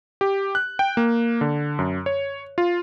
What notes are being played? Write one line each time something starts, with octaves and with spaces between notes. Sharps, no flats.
G4
F#6
G5
A#3
D3
F#2
C#5
F4